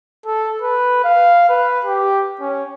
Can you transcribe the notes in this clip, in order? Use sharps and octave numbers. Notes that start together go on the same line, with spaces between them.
A4
B4
F5
B4
G4
C#4